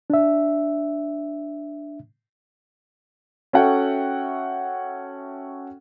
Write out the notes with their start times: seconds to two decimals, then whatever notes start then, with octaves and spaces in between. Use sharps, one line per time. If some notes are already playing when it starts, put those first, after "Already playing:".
0.10 D4 E5
3.53 C#4 F#4 A4 E5 F#5 G5